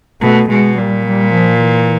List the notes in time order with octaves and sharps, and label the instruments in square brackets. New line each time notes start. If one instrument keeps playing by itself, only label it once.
[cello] B2 [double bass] A3
[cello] B2 [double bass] G#3
[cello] A#2 [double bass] G3
[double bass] G3
F3
E3